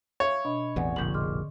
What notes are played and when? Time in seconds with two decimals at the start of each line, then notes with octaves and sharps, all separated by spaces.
0.20 C#5 E5 F5
0.45 B2 D4 D#5 B5
0.76 A1 E2 C4 D5 F#5 G#5
0.96 F1 A#1 A2 D3 G6 F#7
1.14 G#4 D#5 C6 D6 F6